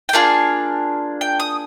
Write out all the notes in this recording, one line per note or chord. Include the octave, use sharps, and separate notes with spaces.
G5
A#3 D4 F4 G#4 F5
G5
D#6